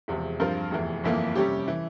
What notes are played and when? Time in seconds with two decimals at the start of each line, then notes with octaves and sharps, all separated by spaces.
0.08 E1 E2 C3 F3
0.40 G2 F3 C4 F4 A#4
0.71 F1 E2 E3
1.04 G1 F2 E3 A#3
1.35 C3 G3 C#4 G4
1.68 E3